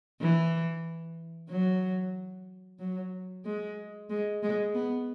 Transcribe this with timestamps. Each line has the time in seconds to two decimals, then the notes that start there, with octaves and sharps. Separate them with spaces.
0.21 E3
1.50 F#3
2.80 F#3
3.45 G#3
4.10 G#3
4.43 G#3
4.75 B3